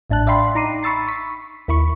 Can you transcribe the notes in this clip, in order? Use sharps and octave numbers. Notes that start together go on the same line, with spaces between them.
A1 A2 D4 A5 F#6
D5 E5 F5 G5 B5 C6
D#4 A#5 D6 C7 D#7
B5 C#6 E6 A6 C7
C#6 B6
D#2 E4 B5 C#6